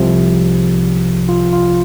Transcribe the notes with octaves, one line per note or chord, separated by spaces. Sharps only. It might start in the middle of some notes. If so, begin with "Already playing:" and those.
Already playing: C2 C3 F3
F4
F4